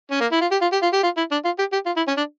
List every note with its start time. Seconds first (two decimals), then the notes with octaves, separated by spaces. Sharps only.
0.11 C#4
0.21 A#3
0.32 E4
0.41 F4
0.52 G4
0.62 F4
0.72 G4
0.83 F4
0.93 G4
1.03 F4
1.17 E4
1.32 D4
1.45 F4
1.59 G4
1.73 G4
1.86 F4
1.97 E4
2.08 C#4
2.17 D4